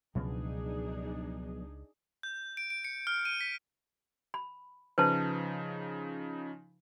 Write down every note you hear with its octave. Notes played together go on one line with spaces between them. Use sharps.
C#2 B2 F3 F#3 D4 D#4 G#4
G6
D7
D7
C#7
F6
D#7
B6
B5
C#3 F3 D#4 B4 C5 A5